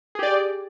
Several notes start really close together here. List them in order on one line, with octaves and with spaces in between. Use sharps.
G#4 G4 D5